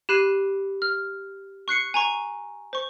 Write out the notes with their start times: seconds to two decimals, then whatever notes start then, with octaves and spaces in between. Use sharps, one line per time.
0.09 G4 B5 F#6 C7 D#7
0.82 F6
1.68 C#6 F#6 C7 C#7
1.94 G#5 A#5 C#6
2.73 C5 C#6